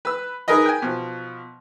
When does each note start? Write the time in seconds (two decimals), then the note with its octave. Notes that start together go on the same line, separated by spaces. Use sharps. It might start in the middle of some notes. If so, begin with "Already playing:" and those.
0.05 B4 E6
0.48 D#4 G#4 A#4 B4 D#5
0.66 G5 G#5
0.82 B2 F3